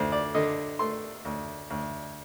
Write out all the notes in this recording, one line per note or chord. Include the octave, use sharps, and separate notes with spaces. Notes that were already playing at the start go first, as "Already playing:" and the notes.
Already playing: D2 C5
D5
D3 D#5
A3 C6
D2
D2